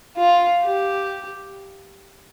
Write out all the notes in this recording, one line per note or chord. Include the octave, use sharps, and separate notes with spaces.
F4
G4